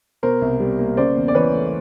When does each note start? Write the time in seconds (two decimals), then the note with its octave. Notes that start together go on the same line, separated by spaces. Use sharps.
0.23 B2 A#4 C5
0.41 C2
0.60 G3
0.79 A#3
0.97 C#3 C5 D5
1.16 E2
1.28 D5
1.34 E3 B4 C#5
1.53 A3